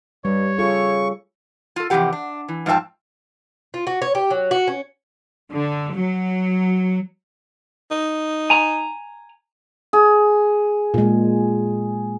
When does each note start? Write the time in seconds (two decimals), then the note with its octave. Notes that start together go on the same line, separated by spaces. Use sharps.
0.25 G2 G3 C#5
0.58 C#3 F4 A4 C#6
1.76 F4 A4
1.90 F2 C3 D#3 E3 G4 F#5
2.12 D4
2.48 E3
2.66 G#2 F3 F4 E5 G5 A5
3.74 F4
3.87 F#4
4.02 C#5
4.15 G4
4.30 F#3
4.51 F#4
4.68 C#4
5.52 D3
5.96 F#3
7.91 D#4
8.50 G#5 A#5
9.93 G#4
10.94 A#2 G#3